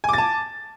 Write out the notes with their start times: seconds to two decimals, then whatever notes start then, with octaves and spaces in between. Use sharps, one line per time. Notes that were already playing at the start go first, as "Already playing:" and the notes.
0.04 G#5
0.09 D6
0.13 A6
0.18 A5